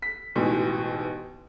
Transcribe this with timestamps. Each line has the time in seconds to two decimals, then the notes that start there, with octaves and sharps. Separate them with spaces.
0.02 B6
0.35 A1 G#2 B2 E3